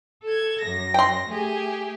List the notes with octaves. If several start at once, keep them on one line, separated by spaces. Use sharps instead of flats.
A4 G#6
F#2 A#6
G5 C6
A3 G4 G#4